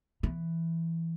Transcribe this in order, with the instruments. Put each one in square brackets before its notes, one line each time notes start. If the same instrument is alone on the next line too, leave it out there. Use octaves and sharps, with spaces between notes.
[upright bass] E3